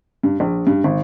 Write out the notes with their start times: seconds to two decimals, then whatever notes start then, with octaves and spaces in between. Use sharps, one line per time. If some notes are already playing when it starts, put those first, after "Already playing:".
0.23 G2
0.40 A#1
0.67 G2
0.84 G#1